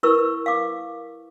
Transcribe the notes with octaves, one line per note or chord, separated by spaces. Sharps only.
E4 A#4 B4 C#6 E6
F5 D6